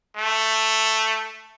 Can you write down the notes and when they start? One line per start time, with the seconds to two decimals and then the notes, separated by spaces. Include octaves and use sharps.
0.17 A3